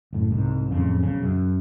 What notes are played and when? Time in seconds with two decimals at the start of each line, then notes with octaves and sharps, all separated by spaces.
0.13 F#1 A2
0.31 C2 G#2
0.71 D1 A#1 F2 C#3
1.03 B1 C#3
1.22 F#2